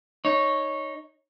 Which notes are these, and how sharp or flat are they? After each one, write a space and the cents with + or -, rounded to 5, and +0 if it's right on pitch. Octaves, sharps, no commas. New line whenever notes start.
D#4 +0 C#5 +0